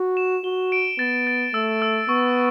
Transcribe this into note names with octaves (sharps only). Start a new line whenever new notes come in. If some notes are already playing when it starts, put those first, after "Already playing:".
Already playing: F#4
E7
F#4 G7
D7
B3 A6
A6
A3 E6
E6
B3 C#6